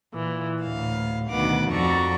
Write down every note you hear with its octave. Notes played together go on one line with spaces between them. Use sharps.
A#2 E3
D2 A2 F5
D2 B2 D#3 B4 F#5 D6
F2 F#4 A4 D5 A#5 C#6